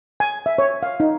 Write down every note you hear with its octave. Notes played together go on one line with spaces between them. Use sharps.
G#5
E5
C#5
F5
D#4